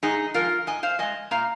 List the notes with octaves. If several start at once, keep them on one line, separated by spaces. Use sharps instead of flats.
G#2 D#4 G#4
F3 G#3 F4 A#4
G#2 D#5 G#5
C5 F5
F3 G#3 D#5 G#5
A#2 F5 A#5